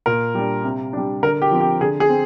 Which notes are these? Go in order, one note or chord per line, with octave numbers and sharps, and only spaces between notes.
A#2 A#4
G3 D4
C3
G3 D4
D3 A#4
G4
F3 C4
G4
D3 G#4
G#4
C4